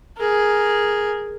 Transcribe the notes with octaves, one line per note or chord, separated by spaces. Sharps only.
G#4 A#4